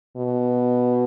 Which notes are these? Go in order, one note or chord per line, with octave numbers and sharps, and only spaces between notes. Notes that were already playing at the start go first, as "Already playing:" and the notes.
B2